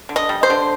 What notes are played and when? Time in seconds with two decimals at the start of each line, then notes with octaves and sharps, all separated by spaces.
0.09 D3
0.16 D#5
0.29 G3
0.43 C5
0.50 D3